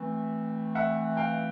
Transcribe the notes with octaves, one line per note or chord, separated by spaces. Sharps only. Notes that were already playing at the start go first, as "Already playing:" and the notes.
Already playing: E3 A3 C4
E5 F#5
F5 G5